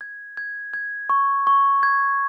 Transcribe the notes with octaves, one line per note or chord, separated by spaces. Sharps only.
G#6
G#6
G#6
C#6
C#6
G#6